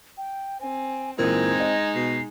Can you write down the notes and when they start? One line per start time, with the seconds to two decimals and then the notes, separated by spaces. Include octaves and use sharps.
0.18 G5
0.61 C4 G#5
1.19 A#2 E3 G#3 C4 D#4 A#4 G#6
1.60 D#5
1.95 B2 C7